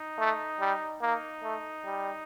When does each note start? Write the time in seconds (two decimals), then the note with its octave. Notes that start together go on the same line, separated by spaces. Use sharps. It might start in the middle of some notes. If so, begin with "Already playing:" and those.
Already playing: D#4
0.18 A3
0.60 G3
1.02 A#3 D#4
1.43 A3
1.85 G3